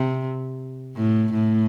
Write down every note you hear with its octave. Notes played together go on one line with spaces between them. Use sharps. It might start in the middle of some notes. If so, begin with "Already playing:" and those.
Already playing: C3
A2
A2